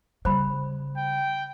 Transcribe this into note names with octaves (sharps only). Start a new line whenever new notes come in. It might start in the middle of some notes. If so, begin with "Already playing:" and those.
C#3 G3 C5 B5
G5